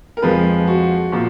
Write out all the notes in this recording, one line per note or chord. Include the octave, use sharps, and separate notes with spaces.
A#4
F2 F3 G#3 B4
F#4
A#2 F3